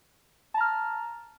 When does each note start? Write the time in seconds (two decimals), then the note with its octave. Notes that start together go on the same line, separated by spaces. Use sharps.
0.54 A5
0.57 A#5
0.61 F6